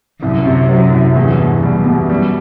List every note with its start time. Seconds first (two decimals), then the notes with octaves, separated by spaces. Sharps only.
0.22 C2 F#2
0.45 C3
0.69 F#3
0.92 C2
1.16 E2 G2
1.39 B2
1.63 F#2 G3
1.86 B2
2.09 F#2 G3